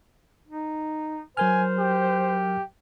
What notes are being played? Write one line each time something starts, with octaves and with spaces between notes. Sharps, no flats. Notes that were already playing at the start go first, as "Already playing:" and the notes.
D#4
F#3 A#4 C5 G#5 F6
G4